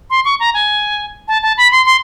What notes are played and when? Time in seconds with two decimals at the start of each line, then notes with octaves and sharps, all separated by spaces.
0.10 C6
0.25 C#6
0.40 A#5
0.54 G#5
1.28 A5
1.43 A5
1.57 B5
1.72 C6
1.86 C6